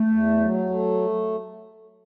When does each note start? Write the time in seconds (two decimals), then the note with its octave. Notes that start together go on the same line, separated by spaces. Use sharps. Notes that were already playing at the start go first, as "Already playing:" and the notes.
Already playing: A3
0.10 E2
0.40 F#3
0.70 A3